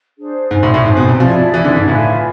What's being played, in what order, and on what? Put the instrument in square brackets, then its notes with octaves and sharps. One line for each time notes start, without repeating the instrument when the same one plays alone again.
[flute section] D4 G#4 C5
[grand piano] G#2 [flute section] C5 G#5 C6
[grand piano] A2
A2
[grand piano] G#2 [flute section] C5 G#5 C6
[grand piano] B2
C3
[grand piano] F3 [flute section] E4 G#4 D5
[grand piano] E3 [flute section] E4 G#4 D5
[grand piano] D3
G#2
[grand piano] A2 [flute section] F4 B4 E5 G#5